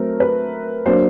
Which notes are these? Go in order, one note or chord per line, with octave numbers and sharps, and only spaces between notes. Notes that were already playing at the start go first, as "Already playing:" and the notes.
Already playing: F#3 A3 C4 A#4
B4
F#3 A#3 D4 C5